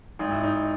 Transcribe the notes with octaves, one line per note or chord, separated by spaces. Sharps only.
G#1 D#4
E4
D#4